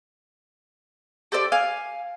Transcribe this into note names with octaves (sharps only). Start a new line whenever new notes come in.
G4 A4 C5 D5
F5 G#5